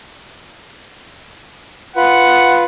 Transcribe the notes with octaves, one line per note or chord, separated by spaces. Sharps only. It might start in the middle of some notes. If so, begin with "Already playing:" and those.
F4 B4 F#5